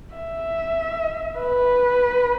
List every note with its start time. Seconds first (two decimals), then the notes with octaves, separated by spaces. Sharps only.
0.14 E5
1.39 B4